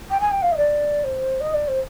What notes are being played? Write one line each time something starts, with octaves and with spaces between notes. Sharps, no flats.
G5
G#5
G5
F5
D#5
D5
C5
D#5
D5
C5